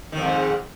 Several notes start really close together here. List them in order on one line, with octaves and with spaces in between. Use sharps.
D#3 F2 G#2